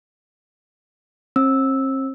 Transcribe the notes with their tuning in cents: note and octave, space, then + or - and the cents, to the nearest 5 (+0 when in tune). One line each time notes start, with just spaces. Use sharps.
C4 +40 E6 -10